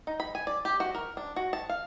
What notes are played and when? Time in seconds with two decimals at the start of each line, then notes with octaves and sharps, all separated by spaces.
0.07 D#4
0.20 B5
0.35 G#5
0.47 D5
0.65 G4
0.80 F#4
0.95 A#4
1.17 D4
1.36 F#4
1.53 A5
1.69 F5